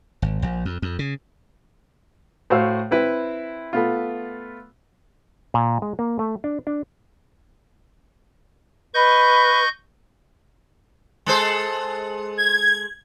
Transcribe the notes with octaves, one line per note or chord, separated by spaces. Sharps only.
G#1
A#1
F2
F2
C#3
A2 F#4 C5 F5 E6
C4 E4 B4
A3 B3 F4
A#2
G#3
A#3
A3
D4
D4
B4 D#5 C#6 G6
G#3 A4 C5
G#6